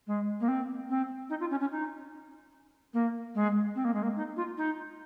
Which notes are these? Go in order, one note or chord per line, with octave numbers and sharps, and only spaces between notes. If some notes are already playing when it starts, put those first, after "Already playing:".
G#3
A#3
C4
C4
D#4
F4
C#4
C#4
D#4
A#3
G#3
C4
A#3
G#3
A#3
D#4
F4
D#4